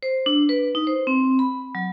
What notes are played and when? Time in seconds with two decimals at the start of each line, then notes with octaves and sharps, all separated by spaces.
0.03 C5
0.26 D4
0.49 B4
0.75 D#4
0.87 C5
1.07 C4
1.39 B5
1.75 F#3